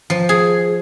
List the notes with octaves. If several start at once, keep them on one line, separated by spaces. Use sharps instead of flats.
F3
G#4